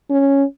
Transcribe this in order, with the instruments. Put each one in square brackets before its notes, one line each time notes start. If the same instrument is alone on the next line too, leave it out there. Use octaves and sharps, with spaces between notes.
[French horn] C#4